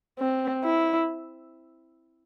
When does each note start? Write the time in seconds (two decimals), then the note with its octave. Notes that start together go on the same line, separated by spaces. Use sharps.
0.19 C4
0.64 E4